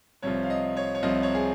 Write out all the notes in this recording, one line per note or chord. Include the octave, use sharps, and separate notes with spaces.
C2 C3 F3 C#5
F5
D#5
C#5
C#5
C2 C3 F3 D#5
C#5
G#4